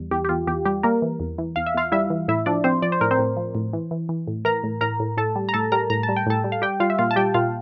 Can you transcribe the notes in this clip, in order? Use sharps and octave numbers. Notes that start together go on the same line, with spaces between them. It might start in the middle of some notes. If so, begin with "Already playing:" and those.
Already playing: E2 G3
E2 G4
G4
E2 F4
E2 G4
G3 G4
G3 A#3 A#4
E3
E2
E3
E2 F5
E5
E2 F4 F5
G3 E4 E5
E3
A2 E4 E5
F3 D4 D5
F3 C4 C5
F3 D5
C5
A2 A#4
C4 C5
A2
F3
A2
E3
E3
E3
A2
E3 A#4 A#5
A2
A2 A#4 A#5
A2
A2 A4 A5
G3
A#5
A2 A4 A5
G3 A#4 A#5
A2 A#5
A5
G3
G5
A2 A4 A5
G3
F5
G3 G4 G5
G3 F4 F5
E5
A#2 F4 F5
A5
G3 G4 G5
A#2 F4 F5